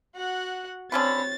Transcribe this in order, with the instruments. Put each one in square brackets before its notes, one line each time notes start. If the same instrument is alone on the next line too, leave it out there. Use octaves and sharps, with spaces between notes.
[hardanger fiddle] F#4 F#5
[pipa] D3 C#4 B4 [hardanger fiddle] C4 C#5 [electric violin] A6